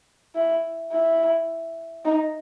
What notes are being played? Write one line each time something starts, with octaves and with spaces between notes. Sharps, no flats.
E4
E4
D#4